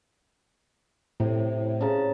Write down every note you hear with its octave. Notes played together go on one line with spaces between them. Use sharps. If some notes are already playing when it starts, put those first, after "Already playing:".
A2 C3
C#3 A5 A#5